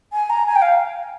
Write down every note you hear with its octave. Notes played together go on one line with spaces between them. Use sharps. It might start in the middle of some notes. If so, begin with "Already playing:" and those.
G#5
A#5
G#5
G5
F5